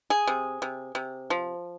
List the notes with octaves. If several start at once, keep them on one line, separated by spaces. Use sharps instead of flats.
G#4
C3
C3
C3
F3